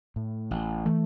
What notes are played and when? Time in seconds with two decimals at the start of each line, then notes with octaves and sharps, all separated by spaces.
0.16 A2
0.51 A1
0.86 E3 A3